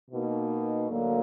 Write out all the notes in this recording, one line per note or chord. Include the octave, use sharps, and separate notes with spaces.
B2 A#3 D#4
D2 D3 F#3 A#3